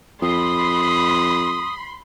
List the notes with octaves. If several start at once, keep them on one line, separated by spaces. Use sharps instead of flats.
F2 B5 C6 D#6